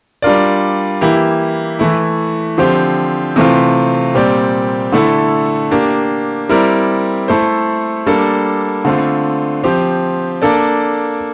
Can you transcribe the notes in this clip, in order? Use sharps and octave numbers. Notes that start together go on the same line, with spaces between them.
G3 D4 F4 A#4 D5
E3 A#3 E4 G4
E3 A3 E4
D3 F3 C4 G4 C5
C3 E3 A3 C4 F4
A#2 G3 C4 G4 D5
D3 A3 E4 A4
A#3 D4 G4
G3 C4 E4 A#4 D5
A3 E4 A4 C5
G3 A#3 D4 A4
D3 A3 C4 F4
F3 C4 G4
A#3 D4 A4 D5